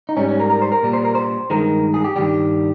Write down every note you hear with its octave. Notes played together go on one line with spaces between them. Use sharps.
D#4
G#2 G3 C#4
C#4
A#4
A#4
C5
A#4
A#2 G3
C5
A#4
C5
G2 D#3 G#3 A#4
G#4
G4
G2 D#3 G3 G4